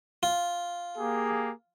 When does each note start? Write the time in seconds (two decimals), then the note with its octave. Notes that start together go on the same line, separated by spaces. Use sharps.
0.23 F4
0.97 A#3 G4 G#4